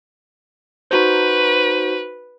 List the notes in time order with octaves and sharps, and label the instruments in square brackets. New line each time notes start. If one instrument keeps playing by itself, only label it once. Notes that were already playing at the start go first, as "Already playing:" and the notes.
[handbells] D#4 F#4 C5 [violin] B4